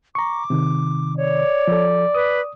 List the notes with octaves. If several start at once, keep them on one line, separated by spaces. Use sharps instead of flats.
A#5 C#6 D6
C3 D#3
C#5 D5
F3 A4
B4 D#6